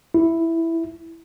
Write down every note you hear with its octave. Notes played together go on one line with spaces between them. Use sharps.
E4